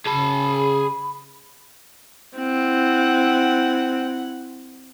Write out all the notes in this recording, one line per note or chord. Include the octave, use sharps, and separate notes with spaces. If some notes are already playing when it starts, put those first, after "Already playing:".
C#3 G#4 A5 B5
C4 E4 F#5